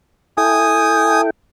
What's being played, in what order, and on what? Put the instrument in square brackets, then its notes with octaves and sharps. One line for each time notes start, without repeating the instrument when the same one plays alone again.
[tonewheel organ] E4 A4 G5 [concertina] G#5 D#6